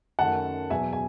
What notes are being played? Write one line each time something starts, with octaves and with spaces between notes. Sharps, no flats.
F#2 D#3 A3 F#5 A5
E2 B2 F#3 B3 E5 G#5
G#5